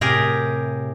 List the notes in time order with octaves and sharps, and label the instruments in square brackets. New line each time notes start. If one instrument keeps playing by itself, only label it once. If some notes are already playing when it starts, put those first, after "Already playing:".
[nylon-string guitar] A2 C3 [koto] G4 G#4 A#4